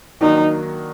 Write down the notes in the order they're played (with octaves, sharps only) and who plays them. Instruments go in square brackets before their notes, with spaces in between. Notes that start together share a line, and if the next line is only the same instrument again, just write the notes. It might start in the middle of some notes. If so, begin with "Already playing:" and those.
[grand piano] D#3 F#3 A#3 D4 [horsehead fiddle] D#4